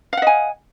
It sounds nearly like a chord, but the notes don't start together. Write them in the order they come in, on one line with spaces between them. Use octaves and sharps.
F5 F#5 D#5 G#5